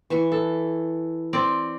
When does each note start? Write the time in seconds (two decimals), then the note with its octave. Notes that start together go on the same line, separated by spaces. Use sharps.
0.10 E3 E5 C#6
0.32 A4
1.33 C4 D5